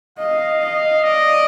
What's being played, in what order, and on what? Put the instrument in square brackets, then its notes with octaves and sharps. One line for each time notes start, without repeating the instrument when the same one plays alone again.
[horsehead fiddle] D#5 [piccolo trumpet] F5
[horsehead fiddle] D#5
[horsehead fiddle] D5 [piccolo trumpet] D#5